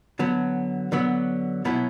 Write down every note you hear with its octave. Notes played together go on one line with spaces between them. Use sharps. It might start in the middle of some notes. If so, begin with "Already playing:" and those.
D3 F#3 B3
D3 F#3 B3
B2 F#3 B3 E4